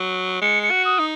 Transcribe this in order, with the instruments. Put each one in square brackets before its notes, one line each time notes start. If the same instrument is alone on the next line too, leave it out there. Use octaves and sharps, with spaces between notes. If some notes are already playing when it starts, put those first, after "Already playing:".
Already playing: [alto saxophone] F#3
[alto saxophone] G#3 [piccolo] C#7
[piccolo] C#7
[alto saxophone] F#4
[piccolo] D#6
[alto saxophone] D#4